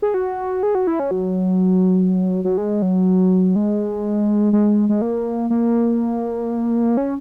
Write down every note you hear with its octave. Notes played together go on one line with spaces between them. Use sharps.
G#4
F#4
G#4
F#4
E4
C#4
F#3
F#3
G#3
F#3
G#3
G#3
G#3
A#3
A#3
C#4